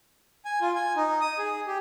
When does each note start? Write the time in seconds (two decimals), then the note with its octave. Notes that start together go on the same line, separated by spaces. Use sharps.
0.45 G#5
0.61 F4
0.75 G#5
0.96 D#4
1.21 D#6
1.38 G#4
1.67 G4